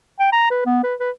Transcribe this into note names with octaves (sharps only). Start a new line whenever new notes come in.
G5
A#5
B4
B3
B4
B4